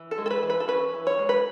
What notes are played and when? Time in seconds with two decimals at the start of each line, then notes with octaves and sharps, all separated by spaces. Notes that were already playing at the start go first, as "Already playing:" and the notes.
Already playing: E3
0.11 A4
0.18 G#3
0.26 A4
0.30 B4
0.43 E3
0.50 B4
0.60 A4
0.68 C#4 B4
0.94 E3
1.07 C#5
1.19 G#3
1.29 B4